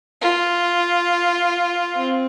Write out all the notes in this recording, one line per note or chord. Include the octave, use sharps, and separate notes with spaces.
F4
C4